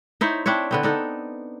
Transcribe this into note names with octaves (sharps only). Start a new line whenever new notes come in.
D#4 E4 C5 C#5
C4 D4 E4 C#5
D3 B3 C4
D4 D#4 A4